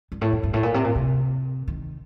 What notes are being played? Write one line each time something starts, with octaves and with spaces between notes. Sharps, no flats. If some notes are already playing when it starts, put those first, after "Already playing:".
G2
A2
F#2
G2
A2
A#2
C3
A#2
C3
D#3